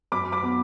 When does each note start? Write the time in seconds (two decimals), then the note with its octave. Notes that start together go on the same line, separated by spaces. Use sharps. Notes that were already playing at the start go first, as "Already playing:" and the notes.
0.12 F#2 B5 D6
0.32 B5 D6
0.42 B3